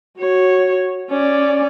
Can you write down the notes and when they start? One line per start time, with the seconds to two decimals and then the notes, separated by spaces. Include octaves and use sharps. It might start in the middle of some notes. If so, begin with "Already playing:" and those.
0.18 F#4 C#5
1.10 C#4 D5